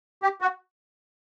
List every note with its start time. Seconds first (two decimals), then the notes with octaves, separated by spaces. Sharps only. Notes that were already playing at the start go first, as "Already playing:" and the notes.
0.23 G4
0.41 F#4